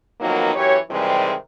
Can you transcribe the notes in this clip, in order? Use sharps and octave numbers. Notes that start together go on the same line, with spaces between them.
F2 D#3 F#3 A#3 B3 D#4
F#2 E3 G4 C#5
C3 D#3 E3 G3 G#3 C4